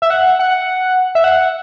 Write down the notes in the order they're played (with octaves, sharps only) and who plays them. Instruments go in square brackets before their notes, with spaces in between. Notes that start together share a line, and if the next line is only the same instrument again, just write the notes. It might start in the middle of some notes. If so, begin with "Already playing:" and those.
[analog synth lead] E5
F#5
F#5
E5
F#5